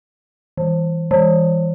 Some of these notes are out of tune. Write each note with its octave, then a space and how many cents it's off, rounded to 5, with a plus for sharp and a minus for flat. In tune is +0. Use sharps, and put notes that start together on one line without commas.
E3 -10
E3 +10